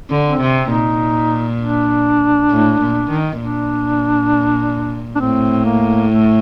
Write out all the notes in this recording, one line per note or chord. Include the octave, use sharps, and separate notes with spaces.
D3
C4
C3
A#2 D#4
D4
A2
A#2
D#3
A#2 D4
D4
A2 C4
A#3
A3